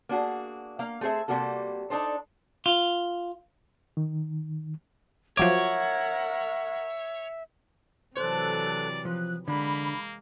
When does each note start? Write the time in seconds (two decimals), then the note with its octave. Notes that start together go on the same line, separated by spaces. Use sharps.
0.09 A#3 D4 F#4 G#4
0.79 A#3 F5
1.01 A3 C4 G#4 C5 E5
1.28 C3 G3 A#3 F#4 A4
1.90 D4 D#4 A4 C5
2.66 F4
3.97 D#3
5.37 F3 F#3 A#4 C#5 E5 F#5 D6
8.17 C3 E3 F#3 A4 C5 D5 F#6
9.05 F3 F#6
9.48 D3 G#3 A#3 B5